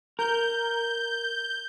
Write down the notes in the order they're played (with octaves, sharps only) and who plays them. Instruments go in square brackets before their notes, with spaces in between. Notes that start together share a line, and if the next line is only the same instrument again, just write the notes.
[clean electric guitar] A#4 [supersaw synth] G6